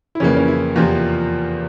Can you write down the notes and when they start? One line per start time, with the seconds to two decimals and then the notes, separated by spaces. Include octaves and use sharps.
0.15 E4
0.20 F2 C#3 E3 A#3 C#4
0.37 C#4
0.48 E4
0.76 E2 C3 F3 A#3 F4